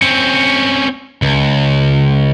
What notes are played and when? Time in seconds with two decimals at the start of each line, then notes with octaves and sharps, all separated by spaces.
0.02 C4 C#4
1.22 C#2